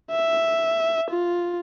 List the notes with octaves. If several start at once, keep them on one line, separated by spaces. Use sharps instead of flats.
E5
F4